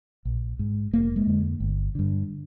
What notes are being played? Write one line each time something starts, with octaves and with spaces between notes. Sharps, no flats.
A#1
G#2
F1 A#3
G#3
F2 D3
G1
G2 D3